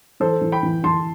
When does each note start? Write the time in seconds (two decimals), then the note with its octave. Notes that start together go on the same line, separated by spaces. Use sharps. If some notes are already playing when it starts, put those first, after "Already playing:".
0.20 E3 A4 C5
0.41 E3
0.52 G5 B5
0.63 E3
0.83 E3 A5 C6